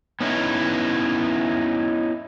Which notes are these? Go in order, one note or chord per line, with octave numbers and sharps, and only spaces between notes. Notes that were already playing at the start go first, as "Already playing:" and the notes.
B3 C#4 D#4 E4